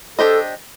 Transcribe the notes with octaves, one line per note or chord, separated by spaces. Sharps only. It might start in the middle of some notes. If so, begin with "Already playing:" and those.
D4 G4 A4 C5 D#5